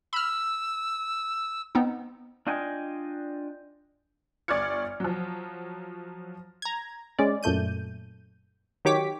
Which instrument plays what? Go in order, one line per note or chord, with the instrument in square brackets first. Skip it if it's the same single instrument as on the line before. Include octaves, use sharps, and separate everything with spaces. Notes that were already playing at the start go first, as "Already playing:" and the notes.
[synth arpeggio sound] B5 F6 [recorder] E6
[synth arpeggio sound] B3 C4 D#4
[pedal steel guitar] D4 F4 D#5 G5 G#5
[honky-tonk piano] G1 D5 C#6 F6 G#6 C#7
F3 F#3
[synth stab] A#5 G#6
G#3 C#4 D5
F#2 A#2 A3 G6 D#7
D#3 F#3 G4 C#5 D6 B6